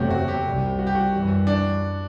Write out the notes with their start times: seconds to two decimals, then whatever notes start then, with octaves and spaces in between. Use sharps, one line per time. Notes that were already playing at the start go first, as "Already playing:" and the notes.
Already playing: F#1 E2 C3 F#3 A3 F#4 G4
0.10 F#4
0.28 G4
0.44 C2 C3 G3
0.79 F#4
0.87 G4
0.95 F#4
1.13 F#2 E3 G3
1.47 D4